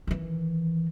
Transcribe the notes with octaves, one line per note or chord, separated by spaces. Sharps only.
D#3 E3